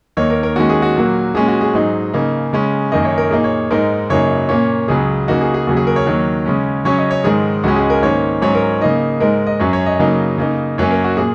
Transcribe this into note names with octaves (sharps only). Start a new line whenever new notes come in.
D#2 D#3 A#3 D#4 C#5
A#4
A#4
D#2 D#3 G#3 C#4 F#4
G#4
F#4
A#2 F#3 A#3
A#2 G#3 C#4 G#4
F#4
G#4
G#2 F#3 D#4
C#3 A#3 D#4
C#3 G#3 C#4
F#2 D#3 A#3 D#4 D#5
C#5
A#4
A#2 A#3 D#4 G#4
C#5
G#2 G#3 D#4 A#4
F#2 C#3 F#3 A#3 D#4 C#5
A#2 A#3 C#4 C#5
C#2 C#3 F#3 G#4
C#3 A#3 D#4 F#4
G#4
G#4
D#2 C#3 F#3 F#4
G#4
A#4
C#5
D#2 D#3 F#3
C#3 G#3 C#4
C#3 F#3 C#4 C#5
D#5
C#5
G#2 D#3 G#3 D#4 G#4
C#2 C#3 G#3 C#4 F#4
G#4
A#4
G#2 D#3 A#3 C#4 C#5
G#2 F#3 C#4 C#5
A#4
C#3 A#3 D#4 D#5
G#2 G#3 D#4 A#4
D#5
F#2 F#3 C#4 C#5
C#5
D#5
C#3 F#3 A#3 D#4
C#3 A#3 D#4
F#2 F#3 A#3 C#4 C#5
A#4
F#4
A#2 A#3 G#4